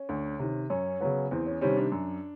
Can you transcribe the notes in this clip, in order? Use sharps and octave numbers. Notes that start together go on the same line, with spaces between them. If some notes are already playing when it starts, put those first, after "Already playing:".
Already playing: C#4
D2
C3 D#3
F#2 C#4
C#3 F#3 B3
E2 C4
C#4
C3 D#3 G3 C4 C#4
D4
F#2